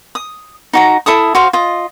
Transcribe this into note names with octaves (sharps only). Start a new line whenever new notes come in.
D#6
D#4 F#4 A#5
E4 A4 E5 D#6
F#4 C5 F5
F4 D#5